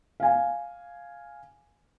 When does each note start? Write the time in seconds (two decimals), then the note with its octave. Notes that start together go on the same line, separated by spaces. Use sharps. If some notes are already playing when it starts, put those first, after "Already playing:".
0.20 F5 G#5